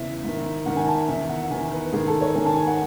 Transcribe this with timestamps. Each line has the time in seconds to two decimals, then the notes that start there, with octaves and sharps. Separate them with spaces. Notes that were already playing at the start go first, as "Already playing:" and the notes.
Already playing: E2 C#3 E3 E5
0.24 G#2 D#3
0.66 G#2 D#3 F#5
0.76 G#5
0.88 A5
0.98 G#5
1.08 E2 D#3 E5
1.29 F#5
1.51 E2 D#3 G#5
1.72 B4
1.93 G#2 D#3 G#4
2.07 A4
2.21 C#5
2.35 G#2 D#3 G#5
2.46 A5
2.56 G#5
2.67 F#5